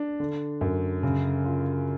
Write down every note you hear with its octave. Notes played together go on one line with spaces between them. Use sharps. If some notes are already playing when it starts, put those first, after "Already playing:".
Already playing: D4
D3
F#2
C#3
F4